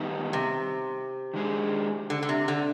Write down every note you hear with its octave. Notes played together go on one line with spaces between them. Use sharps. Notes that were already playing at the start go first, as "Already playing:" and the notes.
Already playing: D#3 G3 B3 D#4
C3
D#3 G#3 D4 G#4
D3
D3
C3
D3